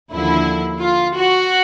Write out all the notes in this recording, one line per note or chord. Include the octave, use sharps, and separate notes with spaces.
D#2 D3 F3 E4
F4
F#4